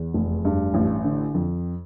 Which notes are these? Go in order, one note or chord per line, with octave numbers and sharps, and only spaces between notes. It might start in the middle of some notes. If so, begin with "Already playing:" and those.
Already playing: E2
F1
G2
A1
D3
F2